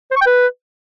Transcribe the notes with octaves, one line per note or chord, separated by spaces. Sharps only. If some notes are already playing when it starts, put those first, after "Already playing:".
C5
C#6
G5
B4